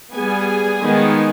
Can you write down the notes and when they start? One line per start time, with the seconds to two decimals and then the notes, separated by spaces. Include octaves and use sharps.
0.13 G3 B3 G#4 G#5
0.82 D#3 G#3 B3